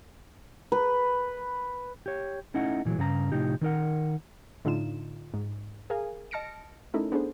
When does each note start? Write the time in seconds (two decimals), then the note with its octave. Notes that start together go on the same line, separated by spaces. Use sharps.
0.72 B4
2.06 G4 C#5
2.54 A3 C#4 D#4 E4 F#5
2.85 A#2 E3 F#3 G#3
2.98 G2 C#3 G#4 A#5
3.32 A2 C3 F3 D#4 G4
3.61 D#3 D#4 A#4 F#5
4.65 A2 D3 D#4 F4 E7
5.34 G#2
5.90 G#4 A#4 F5 G#5
6.31 D#5 A5 F6 A#6 C#7 D7
6.94 A3 C#4 D#4 E4 A4 A#4
7.12 B3 D4 G#4 A4 C5